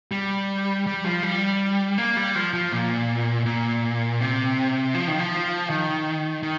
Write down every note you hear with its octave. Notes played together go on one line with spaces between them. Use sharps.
G3
G3
F3
G3
A#3
G3
F3
F3
A#2
A#2
C3
F3
D#3
F3
D#3
D#3